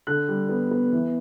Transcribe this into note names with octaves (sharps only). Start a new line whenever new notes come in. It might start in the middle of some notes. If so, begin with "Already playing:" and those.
D3 F#6
G3
B3
B3
E3